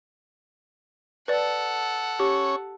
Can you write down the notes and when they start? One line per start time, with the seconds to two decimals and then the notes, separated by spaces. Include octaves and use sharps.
1.28 A4 B4 D5 F#5
2.20 C#4 G4 C#5